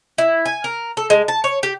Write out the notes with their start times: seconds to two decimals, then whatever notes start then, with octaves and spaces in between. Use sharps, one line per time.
0.18 E4
0.46 G#5
0.64 A#4
0.97 A4
1.10 G#3
1.28 A5
1.44 C#5
1.63 G4